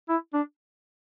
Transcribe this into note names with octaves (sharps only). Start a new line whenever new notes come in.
E4
D4